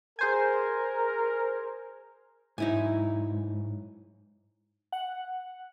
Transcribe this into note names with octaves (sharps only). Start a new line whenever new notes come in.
G#4 A#4 C5 G#5
G#2 F#3 D#4 E4 G#5
F#5